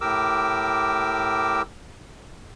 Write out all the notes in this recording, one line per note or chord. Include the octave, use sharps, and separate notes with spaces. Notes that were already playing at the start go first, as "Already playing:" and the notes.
A2 G4 A#4 D6 E6